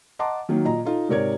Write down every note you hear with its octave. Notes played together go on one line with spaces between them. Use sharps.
D#5 F#5 A5 A#5 C6 D6
D#3 F#3 A#3
A#2 D#5 A#5
D#4 F4 A4
G#2 C3 A#4 C#5 D5 G#6